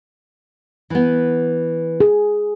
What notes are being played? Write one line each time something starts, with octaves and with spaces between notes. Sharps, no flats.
E3 B3
G#4